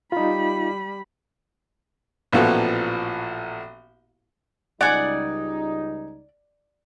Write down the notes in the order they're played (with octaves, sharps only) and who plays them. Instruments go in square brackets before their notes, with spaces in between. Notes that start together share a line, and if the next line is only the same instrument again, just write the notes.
[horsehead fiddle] G3 B5 [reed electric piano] D#4 F4
[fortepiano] A1 A#2 F3 B3 F#4 A4
[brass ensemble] C#2 G3 D#4 [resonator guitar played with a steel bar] D5 [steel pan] F#5 [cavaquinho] G#5 D6